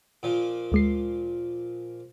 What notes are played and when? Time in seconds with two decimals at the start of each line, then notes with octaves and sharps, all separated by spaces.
0.23 A#2 F3
0.72 D2 G#3 C7